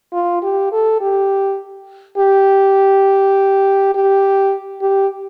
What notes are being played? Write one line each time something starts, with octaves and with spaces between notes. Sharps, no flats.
F4
G4
A4
G4
G4
G4
G4